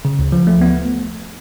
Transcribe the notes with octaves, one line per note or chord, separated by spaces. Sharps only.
C#3
D2
F3
A3
B3